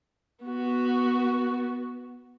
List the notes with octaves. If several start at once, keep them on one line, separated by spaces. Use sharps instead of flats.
B3 F#4